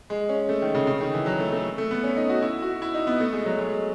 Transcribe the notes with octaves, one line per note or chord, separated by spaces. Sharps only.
G#3
C#4
A3
D#3
C#3
C#3
D#3
E3
F#3
A3
A3
A3
B3
C#4
D#4
F#4
E4
F#4
E4
D#4
B3
A3
G#3
F#3
G#3